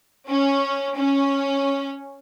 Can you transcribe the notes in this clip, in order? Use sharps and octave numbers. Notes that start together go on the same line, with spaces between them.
C#4
C#4